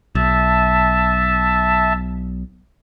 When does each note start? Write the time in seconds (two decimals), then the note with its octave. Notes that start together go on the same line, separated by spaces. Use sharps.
0.15 B1 E5 A5